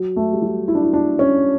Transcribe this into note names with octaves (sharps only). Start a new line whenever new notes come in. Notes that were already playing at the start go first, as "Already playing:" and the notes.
Already playing: F#3
A3
G3
F#3
E4
D4
E4
D4
C#4